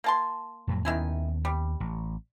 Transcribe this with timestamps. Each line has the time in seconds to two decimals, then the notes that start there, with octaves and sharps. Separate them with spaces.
0.04 A#3 A5 C6
0.67 F2 A2 F#3
0.85 D#2 D#3 B3 C#4 E4 G#5
1.45 G3
1.80 A1